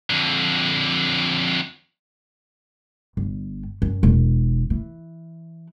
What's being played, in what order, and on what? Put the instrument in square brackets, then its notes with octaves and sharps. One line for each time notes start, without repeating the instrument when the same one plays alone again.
[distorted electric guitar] F2 D3
[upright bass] G1
F#2
E1
E3